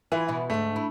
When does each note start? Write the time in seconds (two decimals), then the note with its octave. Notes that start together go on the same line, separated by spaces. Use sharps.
0.12 E3 E4 F4
0.28 B2 E4
0.50 D2 G#2 A3
0.76 E4